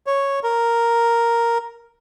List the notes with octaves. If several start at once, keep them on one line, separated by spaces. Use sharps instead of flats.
C#5
A#4